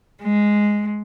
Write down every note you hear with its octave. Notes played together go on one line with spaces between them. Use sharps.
G#3